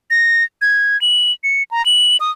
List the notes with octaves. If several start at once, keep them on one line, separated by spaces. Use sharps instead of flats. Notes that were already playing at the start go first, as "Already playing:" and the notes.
A#6
G#6
F#7
C#7
A#5
F#7
D#6